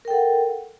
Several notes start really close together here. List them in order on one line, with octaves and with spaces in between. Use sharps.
A#4 G5 A4 F#5